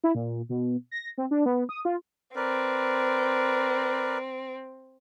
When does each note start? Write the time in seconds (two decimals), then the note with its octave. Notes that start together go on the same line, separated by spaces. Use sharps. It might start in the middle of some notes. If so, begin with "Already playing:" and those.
0.04 E4
0.15 A#2
0.49 B2
0.91 A#6
1.18 C4
1.31 D4
1.46 B3
1.69 D#6
1.85 F4
2.36 C4 A#4 B4 D5